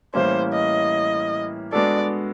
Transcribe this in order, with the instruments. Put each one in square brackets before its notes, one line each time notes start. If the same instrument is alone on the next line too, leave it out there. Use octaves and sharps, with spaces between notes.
[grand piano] A2 E3 G3 A#3 C#4 [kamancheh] C5
[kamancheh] D#5
[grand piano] G#3 B3 D4 F#4 A4 [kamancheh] D5